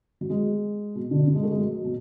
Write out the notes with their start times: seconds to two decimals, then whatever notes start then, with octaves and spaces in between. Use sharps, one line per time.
0.21 F#3
0.30 G#3
0.95 B2
1.11 D3
1.27 D3
1.35 G#3
1.43 A3
1.51 G#3
1.59 F#3
1.84 B2